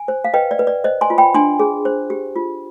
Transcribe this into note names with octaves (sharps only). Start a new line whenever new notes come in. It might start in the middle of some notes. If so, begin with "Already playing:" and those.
Already playing: G#5
C5
F5
B4 D#5 G5
D5
B4
D5
C5 D#5
G#5 C6
F4
G5 B5
D4 G#5 C6
G#4
C5
G4
F4